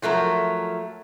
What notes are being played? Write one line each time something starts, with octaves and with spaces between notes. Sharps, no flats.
F3 F#3 A3 A#4